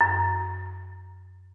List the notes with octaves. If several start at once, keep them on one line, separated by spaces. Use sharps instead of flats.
F#2